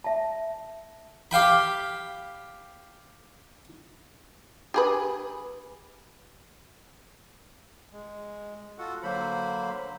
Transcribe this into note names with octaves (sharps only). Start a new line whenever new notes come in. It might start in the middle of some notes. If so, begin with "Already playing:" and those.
E5 A5
G4 F5 G5 B5
G4 G#4 B4
G#3
F4 F#4 A4 F#5
D3 F#3 A#3 C5 B5